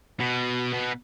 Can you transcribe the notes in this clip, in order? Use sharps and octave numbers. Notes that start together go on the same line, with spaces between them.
B2
B2